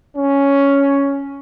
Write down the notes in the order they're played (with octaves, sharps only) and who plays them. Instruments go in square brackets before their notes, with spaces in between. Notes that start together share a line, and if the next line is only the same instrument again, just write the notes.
[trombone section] C#4